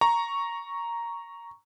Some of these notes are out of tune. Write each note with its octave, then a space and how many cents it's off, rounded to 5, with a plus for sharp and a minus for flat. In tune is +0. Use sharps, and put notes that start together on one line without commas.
A#5 +0 C#6 +0